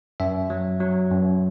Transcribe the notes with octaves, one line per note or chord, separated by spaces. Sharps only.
F#2 E5
F#3
F#3
F#2